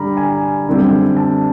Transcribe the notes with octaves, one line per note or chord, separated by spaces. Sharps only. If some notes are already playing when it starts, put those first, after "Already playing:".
Already playing: G2 D3 G3 A#5 B5
G#5
F#2 D3 G3 C4
A5